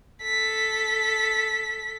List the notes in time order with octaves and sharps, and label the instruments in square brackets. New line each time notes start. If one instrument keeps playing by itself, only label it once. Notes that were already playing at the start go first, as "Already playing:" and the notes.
[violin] A4 B6